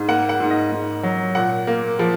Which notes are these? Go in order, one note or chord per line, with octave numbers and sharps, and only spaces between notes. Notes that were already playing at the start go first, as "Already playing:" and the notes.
Already playing: G#2
A#3 F#5
F#5
G#2
D#5
G#2
F#3
A#2 F#5
A#3
F3